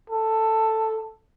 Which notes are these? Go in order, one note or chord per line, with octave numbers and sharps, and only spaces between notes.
A4